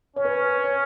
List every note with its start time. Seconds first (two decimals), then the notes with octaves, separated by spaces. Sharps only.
0.16 C#4 C#5
0.25 B4
0.39 B4
0.64 C#5